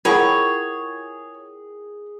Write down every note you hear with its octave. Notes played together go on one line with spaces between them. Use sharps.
E4 F4 G#4 A#4 C#5 F#5 G5 B5